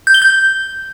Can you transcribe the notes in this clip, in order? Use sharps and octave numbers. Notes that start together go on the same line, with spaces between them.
G6
G7
G6